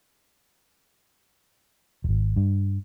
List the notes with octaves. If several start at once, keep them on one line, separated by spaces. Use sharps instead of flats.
D#1 G#1
G2